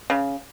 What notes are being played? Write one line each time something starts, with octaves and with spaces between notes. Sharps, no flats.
C#3